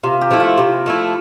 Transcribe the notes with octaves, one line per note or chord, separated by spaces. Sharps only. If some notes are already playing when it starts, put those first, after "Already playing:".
C3 F4
G4
F3 A3 E4
F4
C3 G4
F3 A3 E4